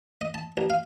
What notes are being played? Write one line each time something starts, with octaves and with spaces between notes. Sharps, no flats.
D#5
A5
A1
F5